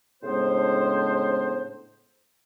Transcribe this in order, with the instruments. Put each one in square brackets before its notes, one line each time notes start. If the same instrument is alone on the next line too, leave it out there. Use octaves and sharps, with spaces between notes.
[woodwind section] A2 C#3 G#3 B3 D4 C5